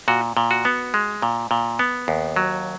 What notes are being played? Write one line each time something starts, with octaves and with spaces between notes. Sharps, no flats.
A#2 F#4
A#2
F#4
B3
G#3
A#2
A#2
B3
D#2
F#3